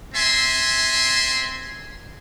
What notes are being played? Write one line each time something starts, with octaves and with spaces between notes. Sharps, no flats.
C4 E5 G#5 C6